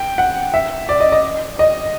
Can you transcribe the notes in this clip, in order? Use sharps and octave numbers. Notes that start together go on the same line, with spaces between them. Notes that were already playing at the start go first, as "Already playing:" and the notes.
Already playing: G5
F#5
E5
D5
D#5
D#5
D#5